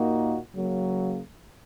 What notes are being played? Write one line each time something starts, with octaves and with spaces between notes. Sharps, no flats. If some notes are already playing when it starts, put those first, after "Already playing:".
Already playing: A#2 A#3 D#4 F#4
C#3 F#3 A#3